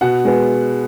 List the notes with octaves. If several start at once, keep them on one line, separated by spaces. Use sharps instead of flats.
B2 F#5
G#3 B3